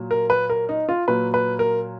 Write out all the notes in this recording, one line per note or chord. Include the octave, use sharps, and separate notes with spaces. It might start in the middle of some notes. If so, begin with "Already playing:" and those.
Already playing: A#2 F#3
A#4
B4
A#4
D#4
F4
A#2 F#3 B4
B4
A#4